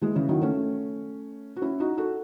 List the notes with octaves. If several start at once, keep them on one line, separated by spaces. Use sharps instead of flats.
E3 G#3
C#3 E3
D#3 F#3
A3 C#4
F#4
C#4 E4
D#4 F#4
F#4 A4